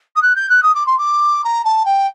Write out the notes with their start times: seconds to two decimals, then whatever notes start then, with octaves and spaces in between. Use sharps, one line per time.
0.16 D#6
0.22 F#6
0.36 G6
0.49 F#6
0.63 D#6
0.74 D6
0.86 C6
0.98 D6
1.44 A#5
1.65 A5
1.85 G5